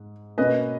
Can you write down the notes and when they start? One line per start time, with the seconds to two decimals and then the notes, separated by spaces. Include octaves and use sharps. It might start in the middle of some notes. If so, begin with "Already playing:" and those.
Already playing: G#2
0.38 B2 A#3 C#4 B4 D#5